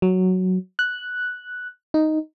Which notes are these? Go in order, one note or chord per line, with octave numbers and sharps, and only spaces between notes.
F#3
F#6
D#4